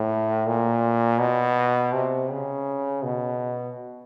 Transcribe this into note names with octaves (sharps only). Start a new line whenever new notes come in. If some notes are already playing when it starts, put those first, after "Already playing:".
Already playing: A2
A#2
B2
C3
C#3
B2